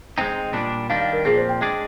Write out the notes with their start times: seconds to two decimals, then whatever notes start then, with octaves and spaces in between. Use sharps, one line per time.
0.17 G#3 C4 D#4 G5
0.53 A#2 G3 D4
0.90 D#3 G3 D4 F5
1.01 F5
1.13 A#4
1.25 A#2 F3 C4 G#4
1.37 C5
1.49 G5
1.61 G#3 D4 G#4 D5